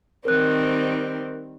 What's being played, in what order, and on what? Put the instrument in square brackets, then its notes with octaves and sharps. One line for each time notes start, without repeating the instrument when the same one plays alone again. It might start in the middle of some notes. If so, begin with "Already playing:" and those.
[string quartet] D#3 G3 C4 [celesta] A#4 C5 F#6